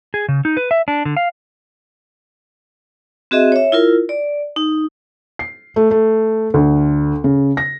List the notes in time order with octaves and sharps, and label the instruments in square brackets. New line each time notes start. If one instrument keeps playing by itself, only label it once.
[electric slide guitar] G#4
C#3
D#4
B4
E5
D4
D3
F5
[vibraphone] C4 F#4 G#4 D#5 E5
C#5 E5
E4 F4 A#4
D5
D#4
[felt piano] C7
A3
A3
D2
C#3
A#6